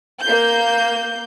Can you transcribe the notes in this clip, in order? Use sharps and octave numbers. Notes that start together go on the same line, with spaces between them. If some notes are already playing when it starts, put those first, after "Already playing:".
A#3 G6